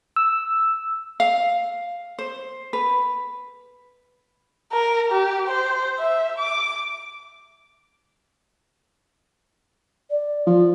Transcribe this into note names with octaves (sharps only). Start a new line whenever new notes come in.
E6
F5
C5
B4
A#4
G4
C5
E5
D6
D5
F3